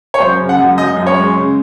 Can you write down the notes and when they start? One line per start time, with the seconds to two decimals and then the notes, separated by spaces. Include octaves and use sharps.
0.14 C#5
0.20 F#2 C5
0.40 C#3
0.49 F#5
0.59 F#2
0.78 F#2 D#5
0.97 F#2
1.07 C#5
1.16 G#3
1.35 C#3